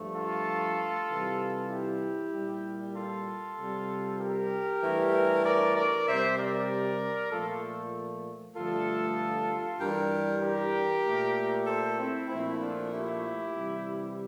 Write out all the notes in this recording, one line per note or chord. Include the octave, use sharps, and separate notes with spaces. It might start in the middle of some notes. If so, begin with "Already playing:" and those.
Already playing: G2 F3 A3
F4 A4
C3 E3 G3
E4 G4
A#2 G3
F4 A4
C3 G3
G4 A#4
G2 E3 A3
A#4 D5
A#4 D5
C3 G3 C5 E5
A#4 D5
A#2 F3 A3 F4 A4
G2 D3 F3 A3 F4 A4
G2 E3 G3 G4 A#4
G4 A#4
A#2 A3
A4 C5
C4 E4
A#2 F3 A3 C4 E4
D4 F4
E4 G4
C3 E3 G3